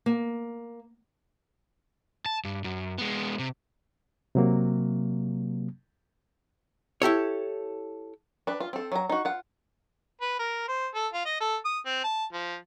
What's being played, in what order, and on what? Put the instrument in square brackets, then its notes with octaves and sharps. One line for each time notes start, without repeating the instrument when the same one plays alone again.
[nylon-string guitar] A#3
[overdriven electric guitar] A5
G2
F#2
G#3 B3
C3
[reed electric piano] C3 F#3 A#3
[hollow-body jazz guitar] E4 G4 A4 C#5
[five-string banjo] D4 B4
F4
C4 A4
F#3 A#5
D#4 F#4
F4 F#5
[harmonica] B4
A#4
C5
A4
F4
D#5
A4
D#6
C4
A5
F3